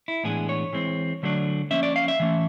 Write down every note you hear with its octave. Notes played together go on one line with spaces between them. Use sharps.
E4
A2 E3 G#3 B3 D4 G#4
C#5
E3 G#3 C4
D3 F#3 A3 D4
F3 A#3 C#4 E5
D5
F5
E5
E3 A3 C#4